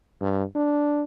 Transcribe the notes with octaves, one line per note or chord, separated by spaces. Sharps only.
G2
D4